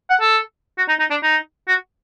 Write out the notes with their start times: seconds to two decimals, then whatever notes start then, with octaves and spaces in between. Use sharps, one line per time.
0.10 F#5
0.21 A4
0.78 F#4
0.88 D#4
0.99 D#4
1.11 D4
1.23 D#4
1.68 F#4